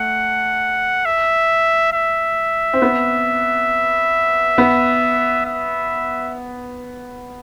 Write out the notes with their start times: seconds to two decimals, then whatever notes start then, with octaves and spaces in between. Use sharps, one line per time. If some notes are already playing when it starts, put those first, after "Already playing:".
Already playing: A3 F#5
1.06 E5
1.93 E5
2.73 C4
2.82 B3
4.58 B3
5.46 E5